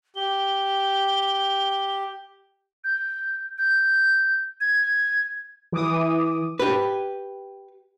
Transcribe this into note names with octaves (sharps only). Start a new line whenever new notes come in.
G4 G7
G6
G6
G#6
E3 D6 D#6
G4 B4